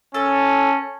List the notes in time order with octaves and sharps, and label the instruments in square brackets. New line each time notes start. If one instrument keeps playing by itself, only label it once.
[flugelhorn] C#4 [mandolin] A4